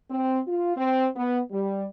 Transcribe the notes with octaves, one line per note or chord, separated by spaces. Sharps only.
C4
F4
C4
B3
G3